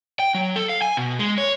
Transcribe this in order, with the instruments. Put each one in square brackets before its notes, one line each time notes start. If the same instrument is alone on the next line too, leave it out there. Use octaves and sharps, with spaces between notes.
[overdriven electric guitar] G5
F#3
A4
F5
G#5
B2
G#3
C#5